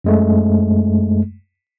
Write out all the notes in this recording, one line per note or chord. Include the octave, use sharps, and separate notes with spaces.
F#2 G#3 A3